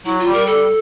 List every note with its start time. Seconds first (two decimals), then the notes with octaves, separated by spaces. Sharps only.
0.05 F#3 E4
0.19 F4
0.26 G3
0.33 A#4
0.47 G3 A4